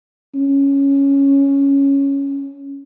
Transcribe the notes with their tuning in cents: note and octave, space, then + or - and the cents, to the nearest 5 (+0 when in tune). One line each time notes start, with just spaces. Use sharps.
C#4 +0